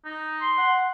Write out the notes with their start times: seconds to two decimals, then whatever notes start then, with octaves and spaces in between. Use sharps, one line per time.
0.05 D#4
0.41 C6
0.58 F#5